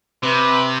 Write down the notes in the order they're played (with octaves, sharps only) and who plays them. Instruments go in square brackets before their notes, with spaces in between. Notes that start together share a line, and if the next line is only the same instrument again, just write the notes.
[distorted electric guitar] C3 [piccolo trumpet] B4